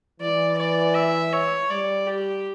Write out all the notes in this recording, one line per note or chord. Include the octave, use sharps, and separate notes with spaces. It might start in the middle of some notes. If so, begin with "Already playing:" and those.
E3 D5
D5
E5
C#5
G3 D5
G4